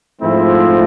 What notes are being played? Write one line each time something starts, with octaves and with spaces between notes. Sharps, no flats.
G#2 F3 A3 C4 E4